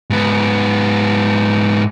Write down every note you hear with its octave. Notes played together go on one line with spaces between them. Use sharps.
G#2 B3